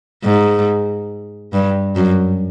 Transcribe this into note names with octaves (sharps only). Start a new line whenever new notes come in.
G#2
G2
F#2